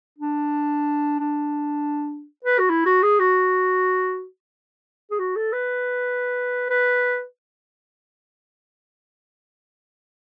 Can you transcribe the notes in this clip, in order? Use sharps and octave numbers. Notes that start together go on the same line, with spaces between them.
D4
D4
B4
F#4
E4
F#4
G#4
F#4
G#4
F#4
A4
B4
B4